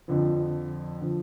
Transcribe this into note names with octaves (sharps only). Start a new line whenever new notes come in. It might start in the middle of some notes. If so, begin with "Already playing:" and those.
F2 D3 F3
D3 F3